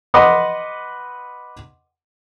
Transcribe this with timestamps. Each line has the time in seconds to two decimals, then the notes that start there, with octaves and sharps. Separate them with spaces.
0.14 B4 D#5 F#5 C6 D6 D#6